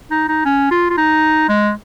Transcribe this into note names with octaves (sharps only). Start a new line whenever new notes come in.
D#4
D#4
C#4
F4
F4
D#4
G#3